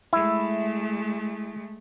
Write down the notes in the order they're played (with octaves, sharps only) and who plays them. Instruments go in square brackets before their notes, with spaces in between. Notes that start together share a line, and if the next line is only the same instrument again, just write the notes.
[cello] G#3 A3 [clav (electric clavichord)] E4